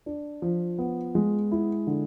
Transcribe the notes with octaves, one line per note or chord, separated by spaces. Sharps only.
D4
F3
B3
G#3
E4
D3